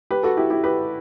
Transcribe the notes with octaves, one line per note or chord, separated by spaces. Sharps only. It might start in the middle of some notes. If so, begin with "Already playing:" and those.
G4 B4
F#4 A4
E4 G4
E4 G4
G4 B4